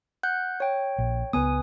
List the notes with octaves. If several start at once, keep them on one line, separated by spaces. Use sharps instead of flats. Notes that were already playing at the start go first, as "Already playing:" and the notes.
F#5 F#6 G6
C#5 G5
A#1
C#2 B3 B4 G#5 D#6